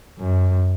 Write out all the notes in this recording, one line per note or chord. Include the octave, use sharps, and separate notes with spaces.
F#2